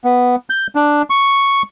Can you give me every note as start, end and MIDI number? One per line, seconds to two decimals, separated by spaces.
0.04 0.36 59
0.50 0.67 91
0.75 1.02 62
1.10 1.62 85